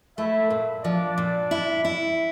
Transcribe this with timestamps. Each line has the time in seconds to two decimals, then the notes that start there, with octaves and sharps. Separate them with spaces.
0.17 A3 E4 E5
0.50 A#2
0.84 F3 D4 D5
1.18 A#2
1.51 E4
1.85 E4